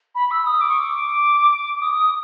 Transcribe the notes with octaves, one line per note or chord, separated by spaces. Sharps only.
B5
E6
D#6
D6
C#6
D6
D#6